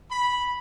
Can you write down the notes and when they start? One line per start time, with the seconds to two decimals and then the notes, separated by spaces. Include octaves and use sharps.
0.10 B5